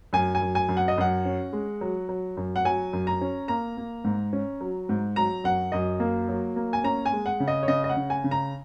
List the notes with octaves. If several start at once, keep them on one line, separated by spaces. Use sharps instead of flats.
F#2 G#5
G#5
F#2
G#5
F#2
F#5
D#5
F#2 F#5
C#4
G#3
F#3
F#3
F#2
F#5
F#3 G#5
F#2
A#5
C#4
A#3 A#5
A#3
G#2
C#4
F#3
G#2
F#3 A#5
F#2 F#5
F#2 D#5
A#3
F#3
A#3
G#5
C#4 A#5
G#5
G#3
F#5
C#3
D#5
C#5
C#3 D#5
D#5
F#5
C#3
G#5
C#3
A#5